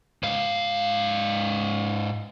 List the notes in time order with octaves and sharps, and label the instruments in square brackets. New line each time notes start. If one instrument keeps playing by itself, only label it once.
[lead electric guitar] G#2 F5